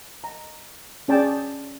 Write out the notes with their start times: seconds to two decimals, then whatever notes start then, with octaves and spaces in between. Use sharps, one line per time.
0.24 A#5
1.08 C#4 G#4 D5 G5 A5